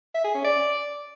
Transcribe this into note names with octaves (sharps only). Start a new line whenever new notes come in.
E5
G#4
C#4
D5